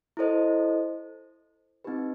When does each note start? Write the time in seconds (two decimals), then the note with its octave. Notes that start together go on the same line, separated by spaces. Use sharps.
0.17 E4 A4 C5 D#5
1.84 C4 D#4 G4 B4